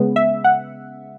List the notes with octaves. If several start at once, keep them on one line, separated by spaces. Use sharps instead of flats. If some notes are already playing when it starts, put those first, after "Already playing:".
Already playing: C#3 G#3 B3
E5
F#5